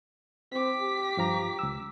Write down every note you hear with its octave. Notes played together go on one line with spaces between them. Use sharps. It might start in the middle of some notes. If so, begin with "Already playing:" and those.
C4 D6 B6
G4
G2 F3 A#5
C#2 E6